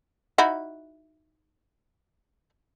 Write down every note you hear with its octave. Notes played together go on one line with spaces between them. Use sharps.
D#4 E4 F#4